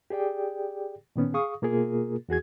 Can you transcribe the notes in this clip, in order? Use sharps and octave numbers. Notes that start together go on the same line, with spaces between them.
G4 G#4 D5 G5
A#2 D#3 B3 C#4
G#4 F5 C#6 D#6
B2 A#3 F4 G#4 A#4
E2 F#4 G#4 G#6